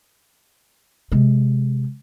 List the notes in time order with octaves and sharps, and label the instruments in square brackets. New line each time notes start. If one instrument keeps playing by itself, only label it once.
[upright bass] C3 G#3